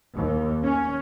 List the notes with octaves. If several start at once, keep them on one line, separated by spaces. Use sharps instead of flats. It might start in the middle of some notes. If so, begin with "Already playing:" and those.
D#2
C#4